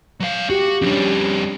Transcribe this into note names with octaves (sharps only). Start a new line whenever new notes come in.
F#3 F5
F#4 G4
F2 G3 C#4 D4